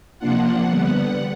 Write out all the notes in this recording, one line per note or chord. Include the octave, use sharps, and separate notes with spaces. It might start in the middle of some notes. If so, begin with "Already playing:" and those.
C3 F3 A#3 D4 F4 F#5
D3 G3 B3